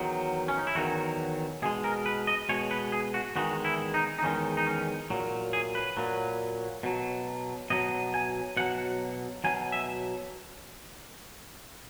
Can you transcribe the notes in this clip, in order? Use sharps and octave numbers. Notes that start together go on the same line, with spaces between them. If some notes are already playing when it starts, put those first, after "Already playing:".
Already playing: E2 D#3 F#3
C#4
D#4
E4
E2 D#3 F#3 F#4
B2 G#3 G#4
A#4
B4
D#5
B2 G#3 C#5
B4
G#4
F#4
E2 D#3 G#3 F#4
E4
D#4
D#4
E2 D#3 G#3 C#4
D#4
C#4
A#2 F#3
G#4
B4
A#2 F#3
B2 F#3
B2 F#3 D#5
G#5
B2 F#3 F#5
B2 F#3 G#5
E5